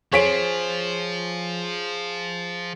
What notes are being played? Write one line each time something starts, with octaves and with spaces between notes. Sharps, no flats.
F3 G#4 C5 C#5 B6 D7